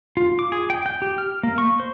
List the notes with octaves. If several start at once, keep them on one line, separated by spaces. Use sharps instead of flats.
F4
D6
G#4
G5
G5
G4
F6
A#3
C#6
C5